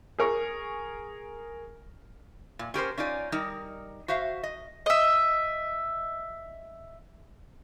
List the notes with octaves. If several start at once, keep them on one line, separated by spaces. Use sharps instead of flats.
G#4 A#4 C#6
A#2
C#4 G4 A#4 C5
C#4 D#4 F4 D5 G#5
G3 D#4 A#4
F#4 C5 E5 F5
D#5
D#5 E5